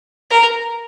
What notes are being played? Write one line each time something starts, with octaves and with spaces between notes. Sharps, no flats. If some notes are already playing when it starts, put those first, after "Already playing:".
A#4